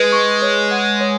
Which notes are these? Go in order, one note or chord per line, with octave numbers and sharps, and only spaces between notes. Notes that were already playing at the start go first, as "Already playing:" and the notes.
Already playing: G#3 B4
C#6
C#5
F#5
C#5